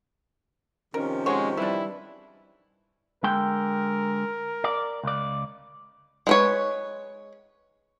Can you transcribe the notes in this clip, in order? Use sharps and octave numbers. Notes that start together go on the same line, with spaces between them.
C3 D#3 F3 C#4 A#4
G#3 F#4 C5 C#5
E3 G3 D4 E4
D3 G#3 A#4 G5
D5
C#2 D5
G#3 B4 C#5